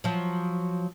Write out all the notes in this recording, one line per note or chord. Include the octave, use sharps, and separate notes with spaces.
F3 F#3